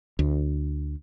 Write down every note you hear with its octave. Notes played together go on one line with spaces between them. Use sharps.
D2